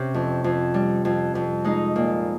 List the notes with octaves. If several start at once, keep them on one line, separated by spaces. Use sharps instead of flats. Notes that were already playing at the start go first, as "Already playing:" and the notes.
Already playing: C3 C#4
F2
F2
G3
F2
F2
G#3 D#4
A#2